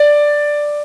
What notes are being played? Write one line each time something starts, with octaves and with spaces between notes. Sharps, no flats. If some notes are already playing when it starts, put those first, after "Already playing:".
Already playing: D5